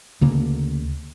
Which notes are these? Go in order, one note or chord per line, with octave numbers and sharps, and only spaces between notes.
D2 C#3 A#3